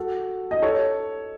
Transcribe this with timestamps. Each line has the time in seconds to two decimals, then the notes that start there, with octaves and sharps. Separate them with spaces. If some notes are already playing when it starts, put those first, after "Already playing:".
Already playing: F#4 A4
0.51 D#5
0.62 A4 C#5